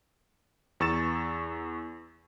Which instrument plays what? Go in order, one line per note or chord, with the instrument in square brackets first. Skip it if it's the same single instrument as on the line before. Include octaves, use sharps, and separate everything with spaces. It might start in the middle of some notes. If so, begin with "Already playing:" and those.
[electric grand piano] E2 C#6 E6 A6 E7